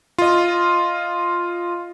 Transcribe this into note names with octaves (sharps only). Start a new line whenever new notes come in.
F4 D#5